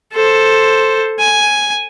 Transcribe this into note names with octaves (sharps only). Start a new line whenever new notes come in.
A4 C5
G#5